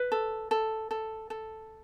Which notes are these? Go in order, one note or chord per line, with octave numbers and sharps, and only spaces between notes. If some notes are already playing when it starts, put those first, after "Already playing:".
Already playing: B4
A4
A4
A4
A4